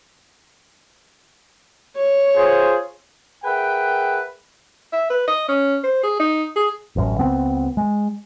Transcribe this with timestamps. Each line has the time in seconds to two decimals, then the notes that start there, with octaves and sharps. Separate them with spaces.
1.96 C#5
2.36 F4 G#4 C5
3.44 G#4 A#4 B4 E5 F#5 G5
4.93 E5
5.10 B4
5.28 D#5
5.48 C#4
5.83 C5
6.03 G#4
6.19 D#4
6.56 G#4
6.96 A1 F#2
7.18 C#2 B3 C4
7.77 G#3